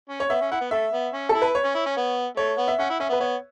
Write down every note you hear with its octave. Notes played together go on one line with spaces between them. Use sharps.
C#4
C#5
B3 E5
C#4
E4 F#5
B3
A3 E5
B3
C#4
A4
E4
B4
C#5
C#4
E4
C#4
B3
A3 C#5
B3
E5
C#4 F#5
E4
C#4 E5
B3
B4
B3 C#5